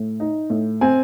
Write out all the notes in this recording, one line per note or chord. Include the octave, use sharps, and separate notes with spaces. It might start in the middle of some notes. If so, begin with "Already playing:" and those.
Already playing: A2
D#4
A2
C4 G#5